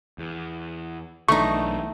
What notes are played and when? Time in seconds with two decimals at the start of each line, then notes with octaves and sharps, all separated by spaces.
0.18 E2
1.29 B1 E3 A3 D4 D#4 C#6